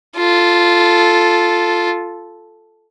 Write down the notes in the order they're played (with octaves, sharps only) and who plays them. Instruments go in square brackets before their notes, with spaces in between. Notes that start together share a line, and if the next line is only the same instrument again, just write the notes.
[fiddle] F4 A4